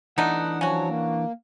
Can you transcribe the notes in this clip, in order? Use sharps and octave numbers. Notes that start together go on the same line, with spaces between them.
E3 A3 B3 D4 D#4 F#5
F3 F#3 C#4 F#4 C#5
A#3